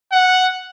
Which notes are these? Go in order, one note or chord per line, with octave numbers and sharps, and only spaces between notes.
F#5